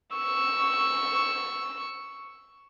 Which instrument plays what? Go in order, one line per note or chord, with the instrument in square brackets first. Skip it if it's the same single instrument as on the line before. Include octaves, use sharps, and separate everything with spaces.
[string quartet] C#6 E6